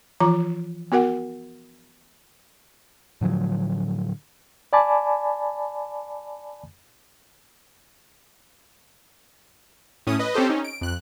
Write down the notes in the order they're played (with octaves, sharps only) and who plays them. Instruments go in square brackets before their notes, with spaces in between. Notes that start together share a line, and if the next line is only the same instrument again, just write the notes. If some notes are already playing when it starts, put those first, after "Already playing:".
[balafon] E3 F3 F4 A#5
B3 F#4 A#4 F#5
[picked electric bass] A2 D3 F3 F#3
[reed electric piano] D5 G#5 A5 B5 D6
[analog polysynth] A2 C#4 D#6
B4 D#5
C4 C#4 G4 A4 C5
C#4 D#4
D7
F2 F#6